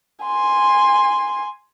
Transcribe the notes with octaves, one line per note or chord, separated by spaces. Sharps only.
G#5 C6